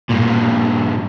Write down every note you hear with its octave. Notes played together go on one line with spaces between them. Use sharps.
G2 A#2